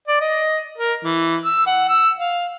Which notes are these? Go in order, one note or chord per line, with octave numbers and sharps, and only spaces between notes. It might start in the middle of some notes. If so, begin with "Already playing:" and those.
D5
D#5
A#4
E3
E6
F#5
E6
F5